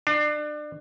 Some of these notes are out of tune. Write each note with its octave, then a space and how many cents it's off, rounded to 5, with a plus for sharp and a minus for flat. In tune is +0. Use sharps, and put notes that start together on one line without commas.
D4 +30